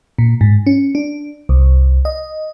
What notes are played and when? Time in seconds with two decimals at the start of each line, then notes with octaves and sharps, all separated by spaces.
0.18 A#2
0.41 G#2
0.66 C#4
0.95 D4
1.49 C2
2.05 D#5